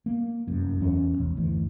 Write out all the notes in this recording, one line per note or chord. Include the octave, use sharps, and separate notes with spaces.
A#3
F1 F#2
E2 C#4
E1 A1
F#1 D2 E3